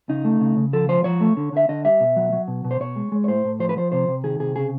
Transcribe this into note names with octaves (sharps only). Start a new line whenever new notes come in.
C#3 D#4
A3
C#3
C#3
F3 A4
F3 C5
F3 C#5
A3
D3
D3 E5
D3 D#5
G3 E5
B2
F#3
F#3
B2
B2
C5
B2 C#5
G#3
G#3
C#5
A2 C5
A2
F3 C5
B4
F3 C5
C3 C5
C3
D#3 G#4
C3 G#4
C#3 G#4